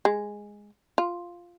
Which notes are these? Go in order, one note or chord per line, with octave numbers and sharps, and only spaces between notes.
G#3
F4